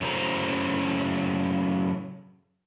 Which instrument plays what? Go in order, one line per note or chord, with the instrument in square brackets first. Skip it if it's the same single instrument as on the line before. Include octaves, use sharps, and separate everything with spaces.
[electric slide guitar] F#2 A2 C#3 F#3 C5 A#5